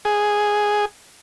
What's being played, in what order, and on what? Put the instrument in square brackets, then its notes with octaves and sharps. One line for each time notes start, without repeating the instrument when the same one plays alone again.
[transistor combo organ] G#4